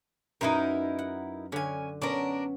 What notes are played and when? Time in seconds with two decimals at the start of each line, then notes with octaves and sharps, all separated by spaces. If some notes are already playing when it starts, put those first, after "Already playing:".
0.41 F#2 D#4 E4 A#4 B4 D#5
0.99 F#5
1.52 D3 C#4 G#5
2.02 B3 C#4 D4 A#4